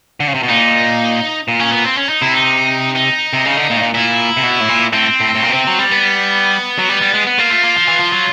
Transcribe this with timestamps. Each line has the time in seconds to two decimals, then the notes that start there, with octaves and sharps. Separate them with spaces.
0.20 D3
0.28 C#3
0.34 C3
0.43 B2
0.50 A#2 D#4
1.48 A#2
1.61 C#4
1.72 B3
1.86 C4
1.97 C#4
2.09 D#4
2.22 C3 E4
2.34 D#4
2.96 D#4
3.33 C3
3.46 C#3
3.57 D3
3.70 A#2
3.77 A2
3.82 A#2
3.94 A#2 E4
4.37 C3
4.43 B2
4.60 A2
4.69 A#2
4.93 A2 C4
5.20 A2
5.35 A2
5.43 A#2
5.50 B2
5.54 C3
5.67 F#3
5.79 G3
5.92 B3
6.78 F#3
6.89 G3
7.01 G3
7.14 G#3
7.27 B3
7.39 A#3 F4
7.51 A3
7.64 A#3
7.76 F3
7.88 E3
8.00 F3
8.13 F#3